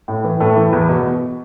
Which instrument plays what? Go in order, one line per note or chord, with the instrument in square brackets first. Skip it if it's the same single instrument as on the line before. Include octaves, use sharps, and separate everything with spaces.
[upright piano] A2
E3
A2 A3
E3
E2
B2